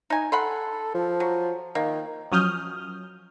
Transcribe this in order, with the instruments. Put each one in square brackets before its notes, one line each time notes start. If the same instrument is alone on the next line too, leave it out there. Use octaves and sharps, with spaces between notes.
[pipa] D#4 G#5
[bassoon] A4 [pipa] F#5 B5 C6
[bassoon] F3
[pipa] F#3
[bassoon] D#3 [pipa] A#3
[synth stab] F3 F#3 C#4 D#6 F6 G6